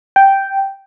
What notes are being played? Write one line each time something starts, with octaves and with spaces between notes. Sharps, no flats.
G5